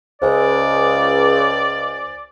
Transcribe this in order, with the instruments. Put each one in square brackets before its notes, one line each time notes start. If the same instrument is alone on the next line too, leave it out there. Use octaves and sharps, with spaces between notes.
[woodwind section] C#2 [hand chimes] C5 G#5 [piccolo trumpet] D5